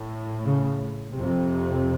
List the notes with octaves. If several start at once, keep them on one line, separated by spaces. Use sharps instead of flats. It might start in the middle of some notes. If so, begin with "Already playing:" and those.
Already playing: A2
C#3
F2 C3